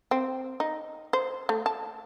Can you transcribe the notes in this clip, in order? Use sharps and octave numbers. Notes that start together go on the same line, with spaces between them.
C4
D#4
C5
A3
A5